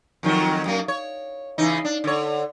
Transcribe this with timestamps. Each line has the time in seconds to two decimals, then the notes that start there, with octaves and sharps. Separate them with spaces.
0.23 F2 D#3 F#3
0.65 F#2 A#3
0.88 C#5
1.58 C#3 E3 D#4
1.85 D4
2.04 D3 C#5